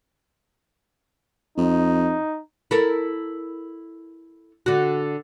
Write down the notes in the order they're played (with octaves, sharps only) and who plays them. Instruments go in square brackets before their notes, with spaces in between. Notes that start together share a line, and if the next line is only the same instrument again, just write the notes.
[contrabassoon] F2 [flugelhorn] D#4
[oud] E4 A4 A#4
D3 F#4